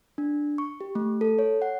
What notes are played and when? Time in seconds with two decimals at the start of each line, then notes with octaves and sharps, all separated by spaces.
0.18 D4
0.58 C#6
0.81 G4
0.95 A3
1.21 A4
1.39 C#5
1.62 F#5